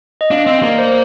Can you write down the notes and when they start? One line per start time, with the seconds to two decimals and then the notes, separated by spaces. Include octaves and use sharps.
0.21 D#5
0.31 D4 F5
0.46 C4 D#5
0.62 A#3 D5
0.78 C5